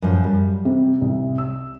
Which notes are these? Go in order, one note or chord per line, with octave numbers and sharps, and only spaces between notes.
F#2 A2 F3
G3
C3
C2
E6